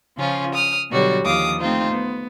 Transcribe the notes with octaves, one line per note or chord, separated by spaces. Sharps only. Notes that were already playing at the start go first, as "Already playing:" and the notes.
C#3 F3 C#4 F4
D#6 F6
B2 D3 F#3 G3 F#4 C#5
D#2 F3 F5 D6 D#6
A3 C4 D#4 F4 C5
B3